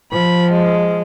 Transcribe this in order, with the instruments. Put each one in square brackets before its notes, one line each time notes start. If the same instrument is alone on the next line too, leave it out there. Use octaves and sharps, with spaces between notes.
[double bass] F3 [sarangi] B5
[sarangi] G#3